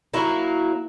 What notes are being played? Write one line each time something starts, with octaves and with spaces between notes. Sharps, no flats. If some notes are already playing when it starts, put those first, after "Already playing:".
F#3 A#3 E4